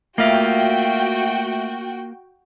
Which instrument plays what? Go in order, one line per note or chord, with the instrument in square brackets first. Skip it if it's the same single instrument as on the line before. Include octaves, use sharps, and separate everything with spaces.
[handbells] A3 E5 [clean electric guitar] A#3 F4 [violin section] F#4 G5